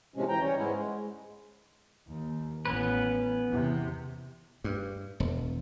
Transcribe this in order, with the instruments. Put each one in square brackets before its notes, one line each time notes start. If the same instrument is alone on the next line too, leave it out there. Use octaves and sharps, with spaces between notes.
[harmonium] A2 C3 F3 G#3 C#4
D2 E3 G5 A#5
G3 C#4 C#5
G#2 G#3 B3 C#4 E4
G#3
[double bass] D#2
[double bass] A1 [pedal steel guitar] B3 C#4 B4
[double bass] E2 C3
[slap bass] G2
E1